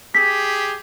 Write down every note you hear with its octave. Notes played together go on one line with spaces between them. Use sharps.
G4 G#4 B6